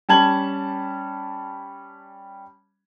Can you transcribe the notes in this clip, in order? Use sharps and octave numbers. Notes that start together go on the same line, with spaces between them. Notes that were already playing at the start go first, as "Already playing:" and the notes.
G3 C#4 A5 G#6 F#7